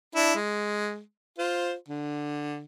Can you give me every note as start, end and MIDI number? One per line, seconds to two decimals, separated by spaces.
0.15 0.34 62
0.15 0.34 64
0.35 1.00 56
1.38 1.74 65
1.38 1.74 72
1.89 2.63 50